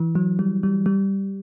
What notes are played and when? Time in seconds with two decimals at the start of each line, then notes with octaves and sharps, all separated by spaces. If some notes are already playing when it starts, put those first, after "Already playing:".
Already playing: E3
0.15 F#3
0.39 G3
0.63 G3
0.86 G3